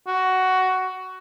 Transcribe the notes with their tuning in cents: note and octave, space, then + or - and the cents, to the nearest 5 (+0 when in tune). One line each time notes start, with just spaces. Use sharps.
F#4 +10